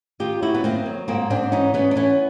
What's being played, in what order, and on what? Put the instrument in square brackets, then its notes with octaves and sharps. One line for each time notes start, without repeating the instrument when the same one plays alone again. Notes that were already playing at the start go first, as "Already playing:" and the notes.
[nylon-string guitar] D#3 F4 G4
F#2 E4 F#4
B3
D#3 A#3 C4
F#3
G#2 A#3 C4
G#2 C4 D4
E3 C#4 D#4
E3 B3 C#4
D4
E3 B3 C#4